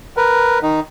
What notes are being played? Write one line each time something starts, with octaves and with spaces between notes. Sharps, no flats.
A#4 B4
D#3 D#4